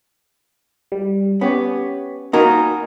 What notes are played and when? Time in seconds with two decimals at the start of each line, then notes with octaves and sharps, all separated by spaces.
0.92 G3
1.41 B3 C#4 G4 C#5
2.33 A#3 D#4 F#4 A#4 G#5